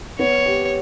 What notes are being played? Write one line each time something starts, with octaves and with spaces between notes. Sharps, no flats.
B3 C#5
G4